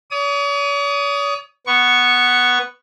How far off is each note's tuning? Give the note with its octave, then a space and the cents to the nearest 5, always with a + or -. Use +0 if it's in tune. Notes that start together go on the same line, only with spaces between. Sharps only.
C#5 +45 D#6 +0
B3 +0 C#6 +0